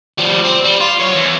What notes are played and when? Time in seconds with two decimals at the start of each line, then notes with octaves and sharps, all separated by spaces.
0.18 F3 G3
0.45 C4
0.65 G3
0.80 F4
1.00 F#2 C#5
1.15 E2